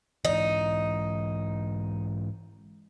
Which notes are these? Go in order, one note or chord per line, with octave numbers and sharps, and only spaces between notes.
G#2 E3 D#4